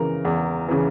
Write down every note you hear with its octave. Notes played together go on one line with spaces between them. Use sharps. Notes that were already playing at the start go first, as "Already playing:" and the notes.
Already playing: C#3 E3 A#4
E2
C#3 E3